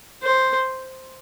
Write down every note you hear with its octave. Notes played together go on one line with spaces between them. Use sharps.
C5